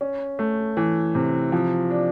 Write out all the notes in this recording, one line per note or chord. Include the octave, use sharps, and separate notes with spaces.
C#4
A3
E3
C3
F3
D4